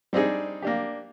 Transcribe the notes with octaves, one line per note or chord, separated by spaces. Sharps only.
G3 C4 D4 D#4 G#4
A#3 D4 G4